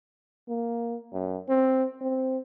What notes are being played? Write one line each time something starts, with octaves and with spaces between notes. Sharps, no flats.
A#3
F#2
C4
C4